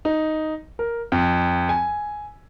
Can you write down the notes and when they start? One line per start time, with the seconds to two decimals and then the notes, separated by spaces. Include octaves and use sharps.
0.05 D#4
0.79 A#4
1.12 F2
1.69 G#5